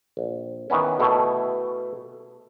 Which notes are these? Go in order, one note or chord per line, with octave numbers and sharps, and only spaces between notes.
A#1
D#3 E3 B3 C#4
B2 A3 E4